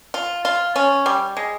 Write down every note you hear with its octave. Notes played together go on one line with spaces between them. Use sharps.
F4
F4
C#4
G3
G#3